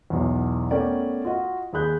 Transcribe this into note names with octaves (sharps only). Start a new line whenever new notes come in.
B1 E2
A3 B3 C#4 A#4 D5 G5
F4 F#4 D#5
D#2 G#4 B5 F#6 G6